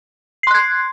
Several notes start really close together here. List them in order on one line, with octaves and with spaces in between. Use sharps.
C7 C6 F#6 G#6